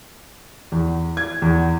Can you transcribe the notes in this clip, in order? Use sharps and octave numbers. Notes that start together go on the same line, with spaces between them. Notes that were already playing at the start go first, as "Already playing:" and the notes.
E2
G#6
E2